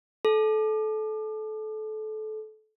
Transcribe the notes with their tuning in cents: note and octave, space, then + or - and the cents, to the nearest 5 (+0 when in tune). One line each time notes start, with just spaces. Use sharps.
A4 -25